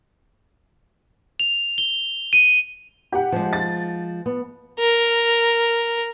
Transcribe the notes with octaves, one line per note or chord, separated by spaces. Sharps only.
F7
G7
D#7
G4 F#5
F3 G#3
A6
B3
A#4